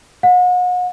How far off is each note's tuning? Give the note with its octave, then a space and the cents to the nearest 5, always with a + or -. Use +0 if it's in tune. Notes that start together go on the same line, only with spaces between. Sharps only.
F#5 -40